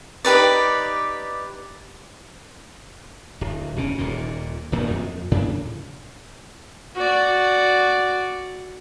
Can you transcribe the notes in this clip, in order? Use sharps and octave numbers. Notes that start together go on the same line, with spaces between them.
D#4 G4 B4 D5
D1
E1 C#3 C#4
D#1 A#2
D1 D2 A#2 F#3
F2
A2 C#3 D4
F#4 D5